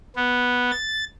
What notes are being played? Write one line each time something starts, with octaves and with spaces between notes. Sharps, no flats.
B3
A6